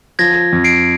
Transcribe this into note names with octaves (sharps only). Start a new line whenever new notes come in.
F3 G#6 A#6
F2
C7 D7